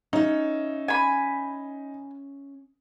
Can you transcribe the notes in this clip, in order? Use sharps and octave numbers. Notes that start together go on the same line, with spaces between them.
C#4 D#4 E5
G#5 B5